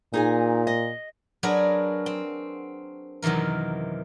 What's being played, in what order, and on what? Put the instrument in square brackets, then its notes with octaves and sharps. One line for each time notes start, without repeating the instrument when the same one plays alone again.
[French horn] A#2 [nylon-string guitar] D#4 G#4 G#5
[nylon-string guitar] D#5
[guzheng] F#3 D4 F#4 G#4 A#4 B4
C4
F#2 C3 D#3 E3 A#4